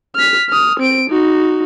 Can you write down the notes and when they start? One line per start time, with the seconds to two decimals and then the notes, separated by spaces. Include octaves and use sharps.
0.15 F6 B6
0.50 D#6 F6
0.80 C4 D7
1.10 D#4 F#4